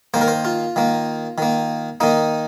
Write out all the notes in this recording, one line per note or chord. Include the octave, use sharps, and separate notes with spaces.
D#3 A#3 C5
A#4
C5
F4
D#3 A#3
D#3 A#3
D#3 A#3 D#4